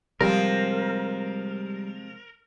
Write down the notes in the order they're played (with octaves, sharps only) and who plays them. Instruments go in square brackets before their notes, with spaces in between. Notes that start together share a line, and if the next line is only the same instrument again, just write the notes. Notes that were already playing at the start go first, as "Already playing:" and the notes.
[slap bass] C3 G#3 [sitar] F3 C4 [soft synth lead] G3 [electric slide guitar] A#4